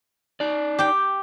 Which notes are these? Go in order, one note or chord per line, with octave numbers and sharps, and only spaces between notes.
D#4 D5
G4 G5